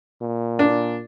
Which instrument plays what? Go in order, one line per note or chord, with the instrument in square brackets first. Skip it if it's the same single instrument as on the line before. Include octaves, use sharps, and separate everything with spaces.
[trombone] A#2
[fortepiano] D4